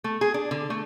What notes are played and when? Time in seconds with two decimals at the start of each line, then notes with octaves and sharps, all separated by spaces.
0.04 A3
0.21 G#4
0.34 D4
0.51 D3
0.70 A3